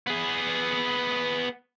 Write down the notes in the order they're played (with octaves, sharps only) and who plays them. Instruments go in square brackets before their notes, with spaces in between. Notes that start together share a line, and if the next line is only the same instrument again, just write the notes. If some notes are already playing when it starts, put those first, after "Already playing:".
[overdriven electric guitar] B3 G#4